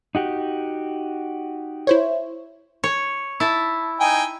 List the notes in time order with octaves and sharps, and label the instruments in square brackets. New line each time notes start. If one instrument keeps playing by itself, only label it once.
[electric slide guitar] D#4 F#4 G4
[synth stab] E4 C5 C#5
[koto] C#5
E4 A5
[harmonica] D#4 G5 G#5